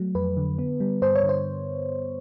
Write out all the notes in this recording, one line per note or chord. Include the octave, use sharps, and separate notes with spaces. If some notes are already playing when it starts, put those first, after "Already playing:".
Already playing: F#3 A3
F2 B4
D3
B3
G3
G2 C5
C#5
D3
C5